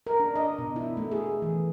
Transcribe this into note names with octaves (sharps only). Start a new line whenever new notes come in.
A#4
D4
D#5
B2
E4
A3
G#4
E3